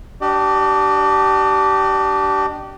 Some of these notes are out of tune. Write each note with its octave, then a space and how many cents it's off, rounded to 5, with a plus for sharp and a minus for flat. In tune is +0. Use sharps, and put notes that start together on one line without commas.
D4 +0 G4 -25 D#5 -45